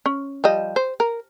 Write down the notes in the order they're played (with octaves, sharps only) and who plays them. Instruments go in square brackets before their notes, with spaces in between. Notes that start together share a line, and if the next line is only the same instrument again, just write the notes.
[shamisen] C#4
F3 G3 D#5
C5
A#4